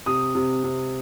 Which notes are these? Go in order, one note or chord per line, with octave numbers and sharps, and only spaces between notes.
C3 D#6
C3
C3